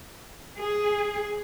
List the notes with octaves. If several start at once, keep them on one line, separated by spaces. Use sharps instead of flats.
G#4